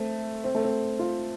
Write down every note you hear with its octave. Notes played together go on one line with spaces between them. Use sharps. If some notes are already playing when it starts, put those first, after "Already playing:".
Already playing: A3 C4
C4
A3
C4
F4